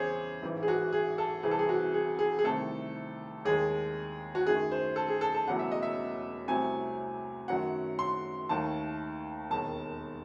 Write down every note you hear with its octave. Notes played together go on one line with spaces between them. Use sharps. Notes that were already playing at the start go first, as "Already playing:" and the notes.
Already playing: E2 C#3 E3 G#4 C5 C#5
A1 G#2 E3
G#4
F#4
G#4
A4
C2 C3 E3 G#4
A4
G#4
F#4
G#4
G#4
G#4
C2 C3 D#3 A3 A4
D#2 D#3 G#3 G#4
F#4
F#2 D#3 A3 G#4
C5
A4
G#4
A4
A4
E1 E2 C#3 F#3 A3 F#5
E5
D#5
E5
C2 C3 F#3 A3 G#5
F#2 D#3 F#3 A3 F#5
C6
D#2 D#3 A3 A5
E1 D#2 D#3 A5